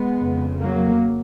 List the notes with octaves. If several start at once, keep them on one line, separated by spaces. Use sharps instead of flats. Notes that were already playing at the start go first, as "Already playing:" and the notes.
Already playing: G#3 B3
F2 C#3
F#3 A#3